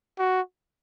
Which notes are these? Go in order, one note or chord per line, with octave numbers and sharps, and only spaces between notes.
F#4